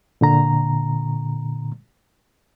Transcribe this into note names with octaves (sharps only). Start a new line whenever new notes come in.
A#2 D3 A#5